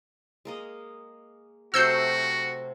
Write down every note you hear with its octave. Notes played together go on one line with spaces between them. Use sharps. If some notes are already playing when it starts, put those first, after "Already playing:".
G#3 A#3 D#5
C3 F#3 A3 F#4 E6 G6 C7